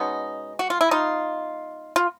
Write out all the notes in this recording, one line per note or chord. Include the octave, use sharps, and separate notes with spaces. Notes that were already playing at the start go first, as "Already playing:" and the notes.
Already playing: B2 G#3 B3 C#4 D#4
F#4
F4
E4
D#4 F4
F4